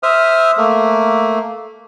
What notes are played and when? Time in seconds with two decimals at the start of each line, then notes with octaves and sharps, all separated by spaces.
0.03 C5 E5 D#6 F6
0.57 A3 A#3